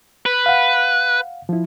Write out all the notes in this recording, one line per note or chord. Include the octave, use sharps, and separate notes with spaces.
B4
F5 F#5
F3 E4